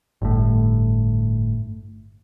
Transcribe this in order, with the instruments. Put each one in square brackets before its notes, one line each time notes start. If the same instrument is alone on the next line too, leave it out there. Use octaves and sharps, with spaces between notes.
[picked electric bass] G1 A2